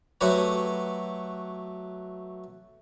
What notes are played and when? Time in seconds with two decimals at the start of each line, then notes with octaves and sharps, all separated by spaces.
0.21 F#3 A3 F#4 G4 B4 C#5